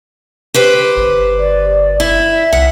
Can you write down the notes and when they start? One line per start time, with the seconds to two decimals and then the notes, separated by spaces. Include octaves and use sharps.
0.54 G4 B4 C5
0.97 G1
1.38 D5
2.00 E4
2.32 E5
2.53 C2 F#5